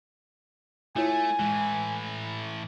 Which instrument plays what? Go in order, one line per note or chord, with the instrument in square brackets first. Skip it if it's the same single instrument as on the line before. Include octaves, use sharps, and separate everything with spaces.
[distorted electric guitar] A3 [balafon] E4 F4 C#5 [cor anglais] G#5
[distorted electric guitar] A2 E3 [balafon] G#3